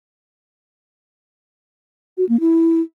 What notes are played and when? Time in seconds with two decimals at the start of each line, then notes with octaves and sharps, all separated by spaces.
2.18 F#4
2.29 A#3
2.40 E4